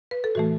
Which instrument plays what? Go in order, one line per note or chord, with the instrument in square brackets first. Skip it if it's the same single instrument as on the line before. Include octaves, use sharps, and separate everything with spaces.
[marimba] B4
A4
A2 E3 A3 F#4